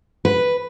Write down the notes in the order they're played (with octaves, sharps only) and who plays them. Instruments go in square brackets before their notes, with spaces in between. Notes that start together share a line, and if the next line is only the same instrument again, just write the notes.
[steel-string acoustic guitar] B4